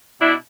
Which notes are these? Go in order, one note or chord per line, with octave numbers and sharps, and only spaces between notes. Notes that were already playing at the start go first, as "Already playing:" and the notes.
B2 D4 E4